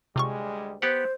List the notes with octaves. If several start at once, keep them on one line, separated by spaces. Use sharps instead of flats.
D2 C3 G3 G#3 F4 C#6
B3 G4 C5 F#5